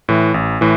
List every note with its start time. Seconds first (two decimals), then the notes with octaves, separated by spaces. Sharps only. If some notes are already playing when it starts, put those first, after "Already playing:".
0.09 A2 E3
0.34 A1
0.61 A2 E3